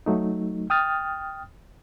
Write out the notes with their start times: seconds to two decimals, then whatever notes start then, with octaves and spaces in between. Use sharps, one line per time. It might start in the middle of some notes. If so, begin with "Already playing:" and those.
0.06 F#3 A3 D#4
0.70 G5 D#6 F6 A6